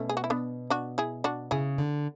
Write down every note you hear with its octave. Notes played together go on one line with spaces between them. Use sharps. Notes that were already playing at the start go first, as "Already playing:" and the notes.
Already playing: B2 A3 C#4
G#4
F#4
E4
B3 D4
D4 F#4
E4 G#4
D4 F#4
C#3 E4 G#4
D3